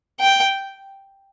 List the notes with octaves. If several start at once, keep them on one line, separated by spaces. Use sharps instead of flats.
G5